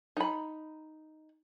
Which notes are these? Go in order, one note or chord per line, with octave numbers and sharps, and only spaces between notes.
D#4 B5